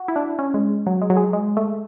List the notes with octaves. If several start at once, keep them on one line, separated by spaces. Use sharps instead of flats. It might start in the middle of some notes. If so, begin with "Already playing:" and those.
Already playing: F#4
E4
D4
C#4
G#3
F#3
G#3
F#3
G#3
G#3
A3